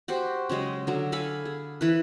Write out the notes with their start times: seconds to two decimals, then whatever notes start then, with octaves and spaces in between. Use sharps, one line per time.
0.08 F#4 G4 C5
0.49 C#3 F#3 G#3 D#5
0.87 D3 F#3
1.12 A4 F5 G#5 B5
1.45 G#4
1.81 E3 B4